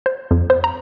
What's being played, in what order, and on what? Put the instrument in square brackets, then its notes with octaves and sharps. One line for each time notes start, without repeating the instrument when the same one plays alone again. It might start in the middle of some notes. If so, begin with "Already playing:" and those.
[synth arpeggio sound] C5
F2
C5
A#5